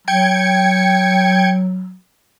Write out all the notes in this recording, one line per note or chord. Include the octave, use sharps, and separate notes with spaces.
F#3 G5 G#6 C#7